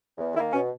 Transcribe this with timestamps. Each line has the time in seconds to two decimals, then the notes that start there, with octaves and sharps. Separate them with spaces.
0.18 E2
0.34 D#3 E4
0.38 A#3
0.52 B2 C#4